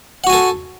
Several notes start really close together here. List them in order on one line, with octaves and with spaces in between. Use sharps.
F#5 F#4 G#5 A4